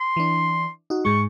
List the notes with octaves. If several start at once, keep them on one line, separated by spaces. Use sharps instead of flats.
C6
E3 D4
D#4 F#4
G#2 G#3 C#6